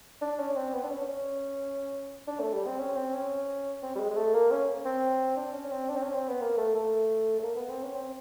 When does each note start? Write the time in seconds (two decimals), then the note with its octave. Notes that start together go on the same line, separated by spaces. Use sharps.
0.22 D4
0.39 C#4
0.56 C4
0.73 B3
0.84 D4
0.91 C#4
1.07 C#4
2.28 D4
2.40 A3
2.54 G3
2.67 C4
2.79 C#4
2.96 C4
3.14 C#4
3.83 C4
3.96 G3
4.00 G#3
4.11 G#3
4.17 A3
4.34 A#3
4.51 C#4
4.85 C4
5.37 D4
5.54 C#4
5.72 C4
5.89 D4
5.96 C4
6.02 C#4
6.14 C4
6.28 B3
6.41 A#3
6.58 A3
6.75 A3
7.39 A3
7.44 A#3
7.56 B3
7.69 C4
7.83 C#4
7.95 C4